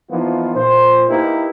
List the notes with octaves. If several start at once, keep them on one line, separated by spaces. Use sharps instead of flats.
E3 F3 A#3 B3 D#4 F4
A#2 C5
A#3 D#4 E4 G4 A#4 B4